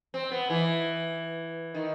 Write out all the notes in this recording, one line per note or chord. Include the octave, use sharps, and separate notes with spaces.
C4
B3
E3
D#3